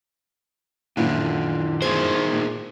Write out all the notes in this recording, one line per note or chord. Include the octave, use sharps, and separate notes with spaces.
F#2 A#2 D#3 E3 F#3 D4 E4 F4
D#3 B3 G#4 A#4 C5 G#6
A#2